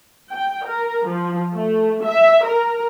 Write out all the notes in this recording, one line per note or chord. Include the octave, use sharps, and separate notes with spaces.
G5
A#4
F3
A3
E5
A#4